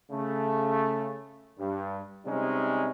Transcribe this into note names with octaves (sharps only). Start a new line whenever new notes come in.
C#3 A3
G2
C3 G3 G#3 C#4 D#4